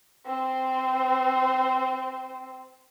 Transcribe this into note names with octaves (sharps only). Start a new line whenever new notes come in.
C4 C5